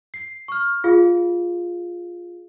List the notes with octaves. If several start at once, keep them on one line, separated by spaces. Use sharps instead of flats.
C7
C#6 F6
F4 G#4 F5